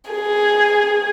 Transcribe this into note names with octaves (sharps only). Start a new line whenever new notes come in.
G#4